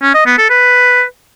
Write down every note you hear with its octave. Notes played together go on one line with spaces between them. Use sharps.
C#4
D#5
B3
A4
B4